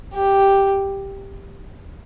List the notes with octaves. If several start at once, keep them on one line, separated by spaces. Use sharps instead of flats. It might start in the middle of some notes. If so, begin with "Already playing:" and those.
G4